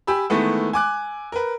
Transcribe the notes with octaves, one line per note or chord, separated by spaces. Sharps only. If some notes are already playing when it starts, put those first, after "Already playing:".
G4 G#5 B5 E6
D#3 E3 G#3 A3 B3
G#5 D6 F#6
A#4 B4